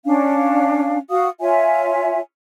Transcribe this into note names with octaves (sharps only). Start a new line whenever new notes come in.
C#4 D4 F5
F#4 F5 D#6
F4 C#5 E5 G#5